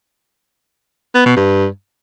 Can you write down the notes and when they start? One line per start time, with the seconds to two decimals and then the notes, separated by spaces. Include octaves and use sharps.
1.15 B3
1.26 B2
1.36 G2